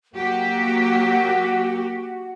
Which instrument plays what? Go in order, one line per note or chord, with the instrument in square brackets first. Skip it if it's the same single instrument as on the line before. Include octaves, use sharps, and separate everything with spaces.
[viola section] F#3 A#3 [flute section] F#4 F#5 [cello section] G4